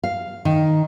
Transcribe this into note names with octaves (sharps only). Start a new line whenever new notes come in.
F5
D#3